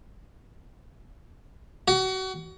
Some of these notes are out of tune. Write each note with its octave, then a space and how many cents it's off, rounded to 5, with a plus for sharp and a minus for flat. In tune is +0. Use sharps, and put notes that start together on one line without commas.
F#4 +30